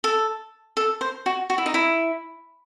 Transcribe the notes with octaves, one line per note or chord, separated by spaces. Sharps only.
A4
A4
C5
F#4
F#4
E4
D#4
E4